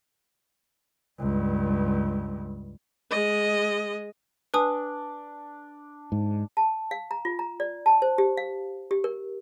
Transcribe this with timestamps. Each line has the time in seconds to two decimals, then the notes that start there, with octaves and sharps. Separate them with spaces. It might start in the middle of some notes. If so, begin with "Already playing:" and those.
1.20 C#2 G2
3.11 G#3 D#5
4.54 D4 B4 G#5 D#6
6.12 G#2
6.57 A5
6.91 F5
7.11 A#5
7.25 F4
7.39 A#5
7.60 D5
7.86 A5
8.02 C5
8.18 G4
8.37 F5
8.91 G4
9.04 A#4